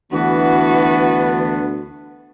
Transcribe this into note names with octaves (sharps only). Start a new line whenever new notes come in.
D2 E3 B3 D4 F#4 B4